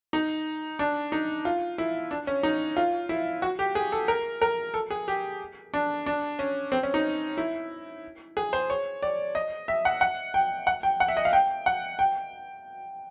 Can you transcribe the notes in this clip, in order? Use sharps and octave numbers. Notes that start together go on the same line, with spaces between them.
D#4
D4
D#4
F4
E4
D4
C#4
D#4
F4
E4
F#4
G4
G#4
A4
A#4
A#4
A4
G#4
G4
D4
D4
C#4
C4
C#4
D#4
E4
G#4
C5
C#5
D5
D#5
E5
F#5
F#5
G5
F#5
G5
F#5
E5
D#5
F5
G5
F#5
G5